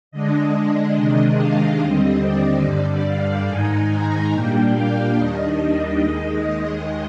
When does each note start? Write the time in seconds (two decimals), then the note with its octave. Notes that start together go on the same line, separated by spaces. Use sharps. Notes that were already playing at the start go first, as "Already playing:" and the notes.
0.11 D3 G#3 D4 D#5
0.53 D#5
0.95 C3 D#3 G#3 D4 D#5
1.37 F5
1.80 D#2 D3 G3 C4 D#5
2.21 D5
2.63 G2 D3 G3 D5
3.05 F5
3.47 G#2 D#3 G#3 D#4 G#5
3.89 A#5
4.31 A#2 G3 A#3 D4 G5
4.74 F5
5.15 D#2 D#3 G3 D4 D#5
5.58 D#5
5.99 D#2 D#3 G#3 D#5
6.42 D#5